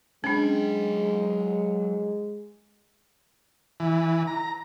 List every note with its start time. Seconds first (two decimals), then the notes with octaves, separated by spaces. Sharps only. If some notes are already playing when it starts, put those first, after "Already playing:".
0.24 F#3 G#3 C#4 D4 G5
3.80 E3
4.27 A#5